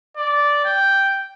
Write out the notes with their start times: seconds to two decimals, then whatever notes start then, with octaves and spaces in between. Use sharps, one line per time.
0.17 D5
0.65 G5